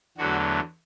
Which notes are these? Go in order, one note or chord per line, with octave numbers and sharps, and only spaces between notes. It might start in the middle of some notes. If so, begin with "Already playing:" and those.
E2 D3 F#3 A3 F#4